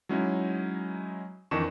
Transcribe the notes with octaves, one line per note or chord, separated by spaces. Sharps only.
F#3 G#3 C#4 D#4 E4
F2 D#3 E3 D4 C#6 E7